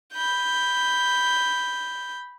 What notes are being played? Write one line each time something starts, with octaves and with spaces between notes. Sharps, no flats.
B5 G6